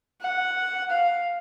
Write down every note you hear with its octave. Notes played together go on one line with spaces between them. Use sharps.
F#5
F5